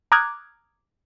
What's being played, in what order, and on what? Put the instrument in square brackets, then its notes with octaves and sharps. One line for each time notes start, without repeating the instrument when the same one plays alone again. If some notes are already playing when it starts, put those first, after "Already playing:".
[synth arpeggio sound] A#5 D6 D#6 F6 F#6 G#6